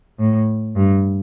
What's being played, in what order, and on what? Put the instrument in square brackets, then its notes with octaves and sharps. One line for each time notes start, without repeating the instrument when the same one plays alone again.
[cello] A2
G2